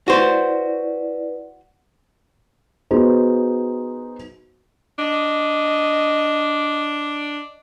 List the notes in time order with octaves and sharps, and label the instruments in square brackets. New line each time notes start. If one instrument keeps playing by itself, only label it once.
[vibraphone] E4 B4 D5 [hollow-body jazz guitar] F#4 C5
[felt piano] B3 D#4 F#4 G#4 C5
[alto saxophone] D4 [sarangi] D#5